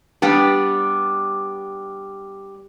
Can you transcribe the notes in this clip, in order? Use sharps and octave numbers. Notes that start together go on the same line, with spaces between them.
G3 B3 D4 G4